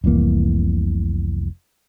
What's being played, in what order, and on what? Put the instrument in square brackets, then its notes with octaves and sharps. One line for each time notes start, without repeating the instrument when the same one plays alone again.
[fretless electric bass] F1 C2 E3 A#3